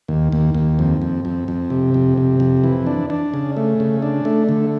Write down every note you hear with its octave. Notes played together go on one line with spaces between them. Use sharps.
D#2
D#2
D#2
F2
F2
F2
F2
C3
F2
C3
F2
E3
D4
D4
C#3
A3
C#3
D4
A3
D3